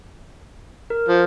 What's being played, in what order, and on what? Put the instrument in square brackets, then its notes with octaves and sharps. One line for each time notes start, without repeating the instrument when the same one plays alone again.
[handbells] A#4
[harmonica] F3